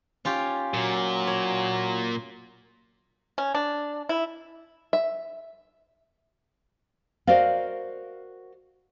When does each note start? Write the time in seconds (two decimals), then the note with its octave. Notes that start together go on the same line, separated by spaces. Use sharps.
0.25 C#4 F4 G4
0.74 A#2 F#3
1.27 C#5
3.38 C#4
3.55 D4
4.09 E4
4.93 E5
7.27 F#4 A#4 C5 D5 D#5 F5